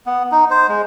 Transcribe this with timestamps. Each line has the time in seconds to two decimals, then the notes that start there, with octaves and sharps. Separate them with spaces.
0.06 B3
0.32 D#4
0.50 C5
0.69 G#3